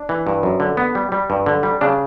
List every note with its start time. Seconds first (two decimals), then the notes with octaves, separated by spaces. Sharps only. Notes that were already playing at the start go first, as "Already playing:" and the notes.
Already playing: D4
0.09 E3
0.27 G2
0.43 F#2
0.60 D3
0.77 B3
0.95 G3
1.12 G3
1.30 G2
1.46 D3
1.63 G3
1.81 C#3 D4